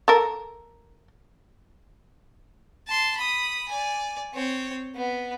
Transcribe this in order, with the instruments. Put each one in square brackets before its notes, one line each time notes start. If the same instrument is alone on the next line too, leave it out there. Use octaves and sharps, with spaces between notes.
[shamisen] A4 A#4
[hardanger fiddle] A5 C6
B5 D#6
D5 G#5
C4 C#5
B3